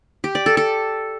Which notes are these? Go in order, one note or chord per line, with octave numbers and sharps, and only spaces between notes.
G4
D5
A4
A4